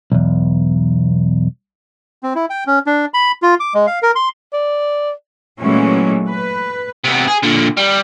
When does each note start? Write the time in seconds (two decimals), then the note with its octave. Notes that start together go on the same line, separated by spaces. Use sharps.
0.12 B1 E2
2.23 C4
2.35 E4
2.50 G5
2.67 C#4
2.87 D4
3.14 B5
3.42 F4
3.60 D6
3.74 G#3
3.87 F5
4.03 A#4
4.15 C6
4.53 D5
5.59 A#2 E3 F#3 G#3 A3 C#4
6.27 B4
7.05 C3 B3
7.28 G#4
7.43 A#2 D3
7.77 G3